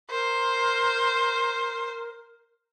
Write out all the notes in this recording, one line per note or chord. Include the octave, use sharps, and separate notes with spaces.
A#4 C5